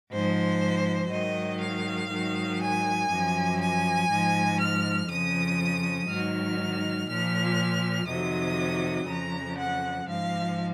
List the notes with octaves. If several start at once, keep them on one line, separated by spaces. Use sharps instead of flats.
G#2 F3 C5
G#2 D#3 F#3 D#5
F5
G#2 D#3 F#3
G#5
F#2 F3
G#5
G#2 F3
F6
F2 C#3 F3 D#6
G#2 D#3 F#3 F6
A#2 F3 F6
F2 C3 D#3 F#3 D#6
F2 C#3 F3 A#5
F#5
G#2 F3 F5